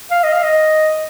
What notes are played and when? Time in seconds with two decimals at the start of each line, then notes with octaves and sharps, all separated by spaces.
0.11 F5
0.23 D#5
0.33 F5
0.43 D#5